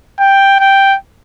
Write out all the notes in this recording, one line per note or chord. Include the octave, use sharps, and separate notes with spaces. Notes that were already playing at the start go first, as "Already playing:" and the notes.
G5
G5